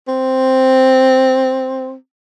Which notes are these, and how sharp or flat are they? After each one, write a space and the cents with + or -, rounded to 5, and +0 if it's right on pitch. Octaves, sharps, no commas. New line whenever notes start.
C4 +0